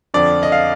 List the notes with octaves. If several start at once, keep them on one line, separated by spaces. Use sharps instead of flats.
F2 D3 F3 D5
D#5
F5